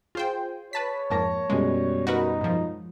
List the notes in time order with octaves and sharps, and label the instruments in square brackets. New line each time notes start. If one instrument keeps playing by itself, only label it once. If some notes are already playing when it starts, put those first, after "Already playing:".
[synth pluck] F4 C5 G5 [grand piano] G#4
[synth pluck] B4 A5 B6 [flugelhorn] C#5
[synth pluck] F2 G#2 A#3 [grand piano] A5 A#6
[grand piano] F#2 B2 G3 [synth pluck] G#3
[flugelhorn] D#4 [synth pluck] F#4 A#4 B4
[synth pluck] G#2 F3